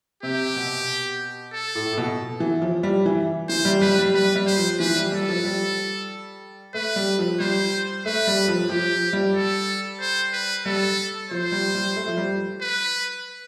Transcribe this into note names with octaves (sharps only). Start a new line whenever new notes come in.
C3 G4
B2
A4
A2
A2
B2
E3
F3
G3
E3
E3 C5
G3
G3 B4
G3
G3 B4
G3
C5
F3
E3 B4
G3
G3 A4
F3
G3
A3 B4
G3
F3
G3 C5
A3 B4
G3
F3
F3 G4
G3
A4
C5
B4
G3 A4
F3 C5
G3
G3
A3
F3
G3
B4